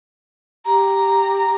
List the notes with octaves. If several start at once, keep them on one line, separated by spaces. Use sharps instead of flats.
G4 A#5